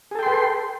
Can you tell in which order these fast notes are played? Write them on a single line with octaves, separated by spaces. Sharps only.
G#4 A4 G5 C6 B4